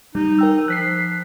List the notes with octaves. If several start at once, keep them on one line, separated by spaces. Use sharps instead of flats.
G3 D#4
A#4 G5 E6
F3 F#6 B6 C7